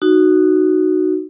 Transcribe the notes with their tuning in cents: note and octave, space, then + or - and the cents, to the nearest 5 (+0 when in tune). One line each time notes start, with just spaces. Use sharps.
D#4 -15 F#4 +0